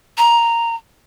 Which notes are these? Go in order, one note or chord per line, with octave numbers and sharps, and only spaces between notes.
A#5